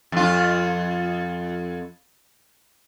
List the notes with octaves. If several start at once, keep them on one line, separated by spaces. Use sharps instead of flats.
F2 F4